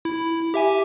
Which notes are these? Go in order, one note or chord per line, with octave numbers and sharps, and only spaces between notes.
E4
G4 E5 G#5